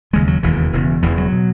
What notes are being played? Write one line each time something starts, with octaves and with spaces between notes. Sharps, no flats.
E1 D#2 C#3 G#3
F#3
E1 D#2 C#3 E3
E1 E2 C#3
E1 E2 C#3 E3
F#3
B2